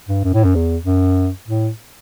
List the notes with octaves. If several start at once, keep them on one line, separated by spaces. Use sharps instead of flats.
G2
F#2
A2
F#2
E2
F#2
A2